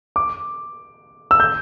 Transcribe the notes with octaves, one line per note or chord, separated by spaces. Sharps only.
D6
E6
G6